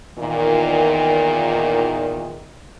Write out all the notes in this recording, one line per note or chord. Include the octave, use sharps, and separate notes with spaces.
E2 A#2 D#3